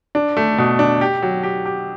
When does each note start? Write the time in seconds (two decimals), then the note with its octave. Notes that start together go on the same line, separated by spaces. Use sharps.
0.15 D4
0.37 A3
0.58 B2
0.79 D4
1.01 G4
1.22 F#3
1.43 G4
1.66 G4